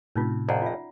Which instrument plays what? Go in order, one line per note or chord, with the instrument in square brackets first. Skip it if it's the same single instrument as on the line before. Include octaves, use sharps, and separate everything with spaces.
[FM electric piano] A2 C3 [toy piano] C#4 D#4 F4
[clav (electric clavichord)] A#1 F2 [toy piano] D5 F#5 A#5
[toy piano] F4 E5